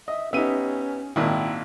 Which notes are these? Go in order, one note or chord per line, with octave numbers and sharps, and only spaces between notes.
D#5 E5
B3 C#4 D#4 G4 E5 D#7
G#1 A#2 D#3 E4